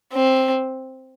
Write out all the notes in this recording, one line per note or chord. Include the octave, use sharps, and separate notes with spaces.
C4